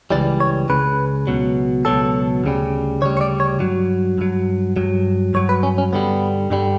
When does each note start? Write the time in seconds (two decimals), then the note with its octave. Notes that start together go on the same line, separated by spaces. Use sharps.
0.11 C#2 C#3 E3 G3 D5
0.40 C#5
0.69 C#2 C#3 B4
1.27 C#2 B2 F#3
1.85 C#2 B2 F#3 A4
2.44 D2 C#3 G3
3.01 D2 C#3 G3 C#5
3.17 C#5
3.21 D5
3.40 C#5
3.60 G2 F#3
4.18 G2 F#3
4.76 G2 F#3
5.34 G2 F#3 C#5
5.49 B4
5.63 C#4
5.78 C#4
5.93 G2 D3 G3 B3
6.50 G2 D3 G3